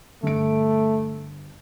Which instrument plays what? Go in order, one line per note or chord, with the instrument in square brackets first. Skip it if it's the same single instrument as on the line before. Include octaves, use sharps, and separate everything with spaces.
[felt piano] G1 D7 [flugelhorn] A3